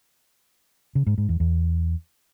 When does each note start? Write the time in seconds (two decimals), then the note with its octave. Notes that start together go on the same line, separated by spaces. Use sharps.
0.95 C#3
1.07 G#2
1.18 G#2
1.29 E2
1.40 E2